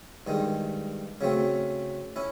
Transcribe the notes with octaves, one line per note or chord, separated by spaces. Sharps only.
G2 D#3 G#3
C#3 F#3 A3 C4
C#4 E4